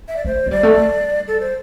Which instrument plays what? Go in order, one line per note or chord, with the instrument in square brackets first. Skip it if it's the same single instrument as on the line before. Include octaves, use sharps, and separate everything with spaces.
[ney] E5
D5
[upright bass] A3 [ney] C5
[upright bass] A3
[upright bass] G3 [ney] D5
[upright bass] A3
G3
[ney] A4
C5